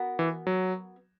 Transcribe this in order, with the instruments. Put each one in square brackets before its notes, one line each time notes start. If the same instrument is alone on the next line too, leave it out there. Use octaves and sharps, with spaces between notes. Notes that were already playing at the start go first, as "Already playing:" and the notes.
Already playing: [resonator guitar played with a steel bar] B3 F#4 A#4
[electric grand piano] E3
F#3